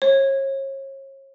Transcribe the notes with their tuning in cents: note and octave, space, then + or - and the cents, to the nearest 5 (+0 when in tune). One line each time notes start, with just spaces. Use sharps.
C#5 -35